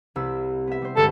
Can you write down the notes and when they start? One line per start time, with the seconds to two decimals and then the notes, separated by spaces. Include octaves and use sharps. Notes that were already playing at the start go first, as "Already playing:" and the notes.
0.16 C2 E4 E6
0.67 B3 E5
0.82 G3 C5
0.97 G1 G#3 A4